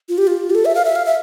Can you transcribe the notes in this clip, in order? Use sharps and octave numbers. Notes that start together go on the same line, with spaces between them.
F4
G4
F4
G4
A4
E5
F5
E5
F5
E5